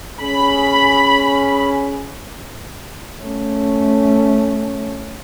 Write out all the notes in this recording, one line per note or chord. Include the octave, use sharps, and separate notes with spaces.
C#4 G#4 B5
A3 C#4